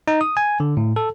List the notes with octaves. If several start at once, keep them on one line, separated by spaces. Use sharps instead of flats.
D#4
D#6
G#5
D3
A2
A4